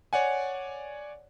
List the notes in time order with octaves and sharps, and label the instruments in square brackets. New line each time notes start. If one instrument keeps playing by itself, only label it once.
[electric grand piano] C#5 D5 F#5 G#5